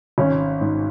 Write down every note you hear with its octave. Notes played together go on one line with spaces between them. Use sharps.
G#1 C#4
G#2